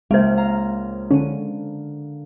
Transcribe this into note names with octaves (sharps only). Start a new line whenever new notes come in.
C#2 G#3 A#3 C5 G6
F5 A#5
D3 C#4 D#7